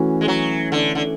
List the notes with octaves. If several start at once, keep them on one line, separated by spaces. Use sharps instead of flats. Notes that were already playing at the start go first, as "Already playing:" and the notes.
Already playing: E3 A3 C#4 F#4
G#3
F#3
D3
D3